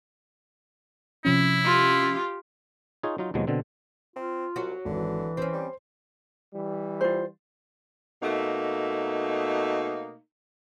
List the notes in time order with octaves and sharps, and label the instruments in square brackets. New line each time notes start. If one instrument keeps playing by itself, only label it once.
[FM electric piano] C3 F3 C#4 [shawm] E4
[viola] F4 G4
[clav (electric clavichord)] D#4 F4 G#4 C#5
F#3 D#4 F4
D#2 B2 F3 F#3 G#3
B2 D3 C4
[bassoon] C4 [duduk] F4
[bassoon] C2 [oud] F#3 F#4
[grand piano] G#1 [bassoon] D3 [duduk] E3
[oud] C4 C#4 [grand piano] C5
[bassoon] G3
[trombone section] E3 G3
[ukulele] F4 C5
[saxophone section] B2 A3 A#3 D#4